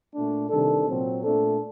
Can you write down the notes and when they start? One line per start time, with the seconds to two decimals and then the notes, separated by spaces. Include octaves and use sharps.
0.14 A#2 A3 D4
0.50 C3 D#3 G3 D4 A4
0.87 A#2 F#3 C4
1.22 A#2 A3 D4 A4